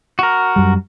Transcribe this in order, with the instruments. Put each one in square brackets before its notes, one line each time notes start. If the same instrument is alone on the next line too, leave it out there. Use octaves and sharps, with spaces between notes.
[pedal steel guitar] F#4 A#4
[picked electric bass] F#2 G3